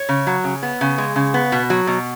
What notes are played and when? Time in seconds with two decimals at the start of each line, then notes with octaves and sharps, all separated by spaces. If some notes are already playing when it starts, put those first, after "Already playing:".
Already playing: C#5
0.09 C#3
0.27 F#3
0.44 C#3
0.63 B3
0.81 C#3
0.98 G#3
1.16 C#3
1.34 B3
1.52 B2
1.70 F#3
1.87 B2